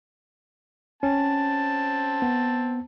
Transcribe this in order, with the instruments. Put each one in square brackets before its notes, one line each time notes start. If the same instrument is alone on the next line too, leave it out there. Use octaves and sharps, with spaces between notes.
[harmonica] C4 A5 [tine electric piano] C#4
[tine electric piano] B3